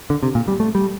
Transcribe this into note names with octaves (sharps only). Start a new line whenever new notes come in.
D3
C3
A#2
G3
A3
G3